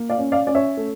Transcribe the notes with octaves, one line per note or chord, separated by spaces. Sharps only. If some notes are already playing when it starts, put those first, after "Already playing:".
Already playing: A#3
D5 F5
C#4
D5 F5
C#4 D5
C#5 E5
A3